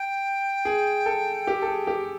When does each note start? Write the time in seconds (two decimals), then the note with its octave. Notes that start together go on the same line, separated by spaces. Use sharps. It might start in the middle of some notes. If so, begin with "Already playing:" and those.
Already playing: G5
0.65 G#4
1.06 A4
1.47 G4
1.62 A4
1.67 G#4
1.87 G4